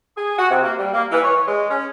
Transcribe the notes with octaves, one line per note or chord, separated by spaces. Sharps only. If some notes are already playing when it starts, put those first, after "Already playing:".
G#4
F#4
C3
A#3
G3
A#3
E3
C#5
G#3
C#4